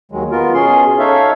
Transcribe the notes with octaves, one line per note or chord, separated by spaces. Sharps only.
D#2 D#3 F#3 G#3
B3 F4 A#4
B2 C#4 G#4 C6
D#4 A4 C#5 E5 F5